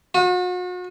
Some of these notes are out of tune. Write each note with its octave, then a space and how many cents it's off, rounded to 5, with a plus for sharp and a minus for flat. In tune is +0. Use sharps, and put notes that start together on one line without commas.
F#4 -40